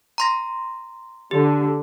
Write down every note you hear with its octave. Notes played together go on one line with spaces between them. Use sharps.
A#5 C6 A#6
D3 G4